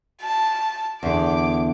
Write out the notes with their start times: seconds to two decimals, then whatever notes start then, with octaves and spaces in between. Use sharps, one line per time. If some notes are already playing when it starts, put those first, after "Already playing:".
0.21 A5
1.03 E2 D3 D6